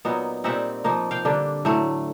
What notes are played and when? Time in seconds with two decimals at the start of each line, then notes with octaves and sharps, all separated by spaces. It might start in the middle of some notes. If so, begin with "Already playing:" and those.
0.05 A#2 F#3 B3 D#4
0.44 A#2 G3 C4 D#4 E5 F#5
0.84 F3 A#3 D#4
1.11 F5 G5
1.25 D3 G3 A#3 D4
1.65 A2 F#3 A3